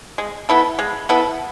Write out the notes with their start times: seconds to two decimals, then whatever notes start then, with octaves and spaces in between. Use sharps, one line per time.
0.18 G#3
0.49 B3 E4 A4
0.79 G#3
1.09 B3 E4 A4